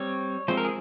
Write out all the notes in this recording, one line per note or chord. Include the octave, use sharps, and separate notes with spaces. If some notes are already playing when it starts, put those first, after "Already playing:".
Already playing: G3 C4 C#5
F3 G#3 C4 C5
A#4
G#4